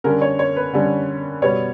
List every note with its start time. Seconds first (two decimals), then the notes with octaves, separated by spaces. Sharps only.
0.04 D3 G3 C#4 A#4
0.22 C#5
0.39 C#5
0.56 B4
0.73 D3 G3 C#4
1.42 B2 G3 B3 C#5